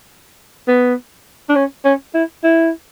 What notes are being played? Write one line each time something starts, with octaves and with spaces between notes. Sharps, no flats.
B3
D4
C#4
C#4
E4
E4